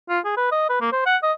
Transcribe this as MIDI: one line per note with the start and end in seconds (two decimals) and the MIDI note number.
0.09 0.20 65
0.25 0.32 68
0.37 0.48 71
0.52 0.69 75
0.70 0.79 71
0.81 0.92 58
0.92 1.04 72
1.06 1.17 78
1.23 1.32 75